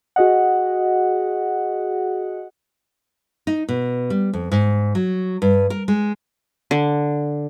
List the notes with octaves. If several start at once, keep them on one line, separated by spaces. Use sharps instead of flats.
F#4 G#4 D#5 F#5
D#4
B2
G3
F2
G#2
F#3
G2
A#4
G#3
D3